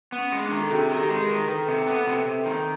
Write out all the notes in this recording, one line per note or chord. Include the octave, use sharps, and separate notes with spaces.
B3
C#4
G#3
D4
D#3
A4
C3 F#4 G#4
D#3
G4 A4
G#3
G#4 A#4
D#3
D#3 A4 B4
C3
B3
C3
C3
D#3